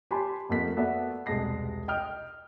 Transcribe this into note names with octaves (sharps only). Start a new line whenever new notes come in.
G4 G#5 A5 B5 C6
F2 A3 B3 A#4 B6
B3 F#4 A4 D5 E5
E1 C2 G#3 A5 A#6 C7
D#5 G5 D#6 F6